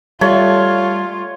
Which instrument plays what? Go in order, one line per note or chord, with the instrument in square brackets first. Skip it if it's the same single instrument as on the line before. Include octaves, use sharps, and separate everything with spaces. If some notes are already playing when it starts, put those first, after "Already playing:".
[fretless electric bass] G3 [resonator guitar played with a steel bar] A3 [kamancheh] F4 [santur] C#5